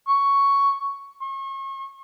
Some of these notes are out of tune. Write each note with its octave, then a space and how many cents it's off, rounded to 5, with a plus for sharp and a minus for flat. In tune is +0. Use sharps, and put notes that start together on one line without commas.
C#6 +5
C#6 -40